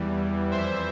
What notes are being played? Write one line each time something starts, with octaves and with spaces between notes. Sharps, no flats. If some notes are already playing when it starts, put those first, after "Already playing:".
Already playing: E2 E3 G3
F2 E3 G3 C5 E5